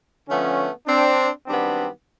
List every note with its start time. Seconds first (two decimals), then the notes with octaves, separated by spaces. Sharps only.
0.28 D3 F3 A3 B3 C#4
0.87 C4 D4
1.47 F#2 D#3 G3 B3 C4 D4